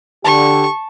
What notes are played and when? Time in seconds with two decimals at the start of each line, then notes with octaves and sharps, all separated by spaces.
0.24 D3 G4 A5 C#6